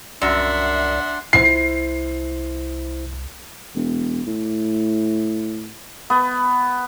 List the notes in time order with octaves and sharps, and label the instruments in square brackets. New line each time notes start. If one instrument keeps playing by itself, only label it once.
[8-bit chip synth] C2 D5 [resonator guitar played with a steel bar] F#2 F#4 [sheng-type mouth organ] D4 C6 [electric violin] E5 F#5
[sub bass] C2 [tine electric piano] E4 C5 [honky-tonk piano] C7
[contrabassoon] E1
A2
[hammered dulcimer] B3